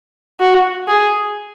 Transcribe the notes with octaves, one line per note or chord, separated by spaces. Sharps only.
F#4
G#4